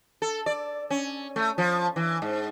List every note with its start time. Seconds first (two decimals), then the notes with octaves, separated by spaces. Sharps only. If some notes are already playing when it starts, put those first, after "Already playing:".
0.22 A4
0.46 D5
0.90 C#4
1.36 A3
1.58 F3
1.96 E3
2.22 G#2